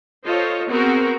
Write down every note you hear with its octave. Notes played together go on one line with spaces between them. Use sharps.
F4 A4 C5 C#5 D#5
B3 C4 F#4 G#4 A#4 A#5